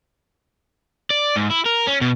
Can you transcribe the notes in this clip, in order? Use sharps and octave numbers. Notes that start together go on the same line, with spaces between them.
D5
G#2
E4
A#4
C#4
B2